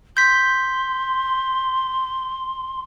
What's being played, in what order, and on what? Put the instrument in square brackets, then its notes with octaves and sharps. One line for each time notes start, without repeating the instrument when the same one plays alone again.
[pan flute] C6 [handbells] G6 B6